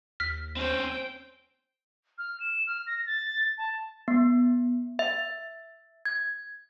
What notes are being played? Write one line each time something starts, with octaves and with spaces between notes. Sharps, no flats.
D#2 F6 B6
C4 C#4 C5 G5
F6
E7
F6
A#6
A6
A5
B3
E5
G#6